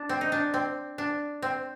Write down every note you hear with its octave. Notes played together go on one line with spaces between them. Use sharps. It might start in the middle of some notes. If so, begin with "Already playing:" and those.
Already playing: D4
C4
D#4
D4
C4
D4
C4